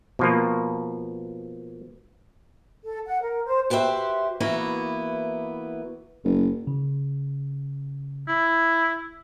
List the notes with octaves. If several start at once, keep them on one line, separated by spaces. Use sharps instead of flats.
B2 F3 A#3
A4
F#5
A#4
C5
F#4 G4 B4 C5 E5
E3 A#3 B3 E4 F#4
F#1
C#3
E4